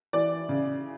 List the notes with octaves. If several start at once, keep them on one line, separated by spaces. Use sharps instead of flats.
E3 D5
C#3